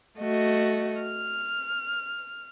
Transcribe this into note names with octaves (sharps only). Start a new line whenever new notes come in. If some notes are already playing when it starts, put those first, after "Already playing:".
A3 F#4 D#5
F6